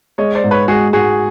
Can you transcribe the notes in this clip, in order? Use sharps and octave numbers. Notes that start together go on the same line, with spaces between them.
G#3 C#5 D#5
C5 D5
G#2
B4 C#5
G#3 F#4 G#4
G#2 F#4 G#4